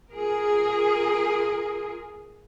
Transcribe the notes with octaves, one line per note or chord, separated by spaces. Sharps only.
F4 G#4 A#4